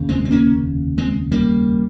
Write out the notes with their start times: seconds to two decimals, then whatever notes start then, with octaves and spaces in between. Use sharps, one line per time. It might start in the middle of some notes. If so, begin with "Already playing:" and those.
Already playing: F1 D#2 C#3
0.09 G#3 C4
0.25 C4
0.31 A#3 C#4
0.98 G#3 C4
1.32 G3 A#3